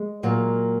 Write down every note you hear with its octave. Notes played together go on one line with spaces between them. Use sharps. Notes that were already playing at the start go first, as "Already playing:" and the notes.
Already playing: G#3
A#2 F#3 A#3